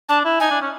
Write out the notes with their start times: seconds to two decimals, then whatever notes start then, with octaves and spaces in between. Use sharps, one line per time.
0.09 D4 A5
0.25 E4
0.40 D#4 G#5
0.51 D4
0.62 C#4